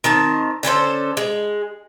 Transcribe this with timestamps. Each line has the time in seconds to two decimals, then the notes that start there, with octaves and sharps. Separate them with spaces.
0.04 D#3 C4 A5
0.63 D3 C#4 A4 C5
1.17 G#3